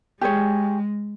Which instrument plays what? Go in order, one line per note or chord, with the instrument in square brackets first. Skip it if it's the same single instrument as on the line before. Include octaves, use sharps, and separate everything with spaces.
[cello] G#3 [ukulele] G4 G#4 C#5